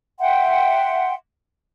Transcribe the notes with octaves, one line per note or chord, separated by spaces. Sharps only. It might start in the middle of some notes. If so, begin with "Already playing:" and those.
E5 F#5 G5 C6